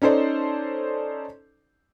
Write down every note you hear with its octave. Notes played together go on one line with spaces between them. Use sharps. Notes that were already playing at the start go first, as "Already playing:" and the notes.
C#4 D#4 A4 C5 D5